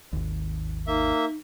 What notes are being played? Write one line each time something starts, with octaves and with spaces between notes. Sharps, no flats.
G#1 D#2
A#3 D#4 E5